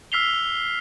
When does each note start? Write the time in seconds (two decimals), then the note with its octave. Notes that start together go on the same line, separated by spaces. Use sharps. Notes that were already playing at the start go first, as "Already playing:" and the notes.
0.12 E6 F6 B6 C7 F7 G7